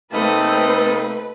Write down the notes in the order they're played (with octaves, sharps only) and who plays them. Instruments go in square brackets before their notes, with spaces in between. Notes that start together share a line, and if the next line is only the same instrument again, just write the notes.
[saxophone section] C3 A#3 D#4 [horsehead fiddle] A3 C4 [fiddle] A4 D#6 [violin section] B4